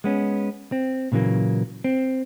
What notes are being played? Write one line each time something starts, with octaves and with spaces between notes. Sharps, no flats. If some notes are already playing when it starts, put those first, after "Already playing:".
G#3 B3 C#4
C4
A#2 C#3 E3 F#3 A#3
C4